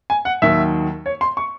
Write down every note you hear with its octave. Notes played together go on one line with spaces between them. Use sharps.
G#5
F#5
D#2 D#3 F#3 E5
C#5
C6
C#6